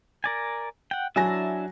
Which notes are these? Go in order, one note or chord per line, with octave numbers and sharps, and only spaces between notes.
A#4 D5 G#5
F#5 G5
F#3 D4 E4 E5 G#5 A#6